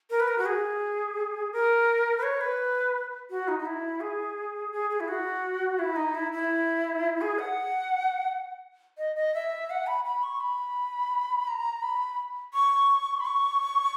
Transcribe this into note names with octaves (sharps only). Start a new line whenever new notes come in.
A#4
B4
A#4
F#4
G#4
A#4
B4
C#5
B4
F#4
D#4
D#4
E4
G#4
G#4
G#4
E4
F#4
E4
D#4
E4
E4
G#4
F#5
D#5
D#5
E5
F#5
B5
B5
C#6
B5
A#5
B5
C#6
B5
C#6